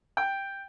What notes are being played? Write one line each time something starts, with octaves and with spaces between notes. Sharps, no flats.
G5